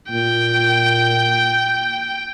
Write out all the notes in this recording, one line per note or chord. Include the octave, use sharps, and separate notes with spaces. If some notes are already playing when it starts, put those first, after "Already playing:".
A#2 G5